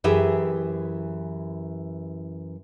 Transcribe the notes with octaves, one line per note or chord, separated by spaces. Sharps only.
F#2 E3 G4 G#4 E5